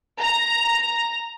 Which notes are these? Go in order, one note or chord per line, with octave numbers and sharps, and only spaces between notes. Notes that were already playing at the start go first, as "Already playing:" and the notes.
A#5